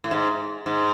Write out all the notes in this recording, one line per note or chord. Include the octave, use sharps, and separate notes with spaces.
A2
G#2
G#2